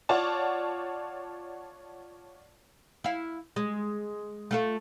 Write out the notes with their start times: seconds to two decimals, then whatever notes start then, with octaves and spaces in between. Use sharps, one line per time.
0.09 F4 C#5 D5 F#5 A5
3.04 E4 F5
3.56 G#3
4.51 A3 F4 A4